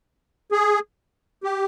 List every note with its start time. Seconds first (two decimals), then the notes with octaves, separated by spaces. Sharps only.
0.52 G#4
1.44 G4